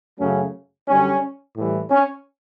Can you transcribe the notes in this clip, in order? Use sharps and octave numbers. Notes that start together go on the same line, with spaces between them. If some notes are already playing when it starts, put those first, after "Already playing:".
F#2 C#3 F#3 A3 C#4
F#2 D3 G3 C#4
A2 E3 G3
C#4